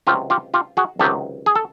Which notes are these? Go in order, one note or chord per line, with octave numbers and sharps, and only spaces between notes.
C#2 C3 D#3 F#3 F4 G4
F4 G4
F4 G4
F#4 G#4
C#2 C3 D#3 F#3 G4 A4
G#4
A4